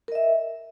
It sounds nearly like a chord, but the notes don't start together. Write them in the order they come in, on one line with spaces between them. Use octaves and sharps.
A#4 D#5 E5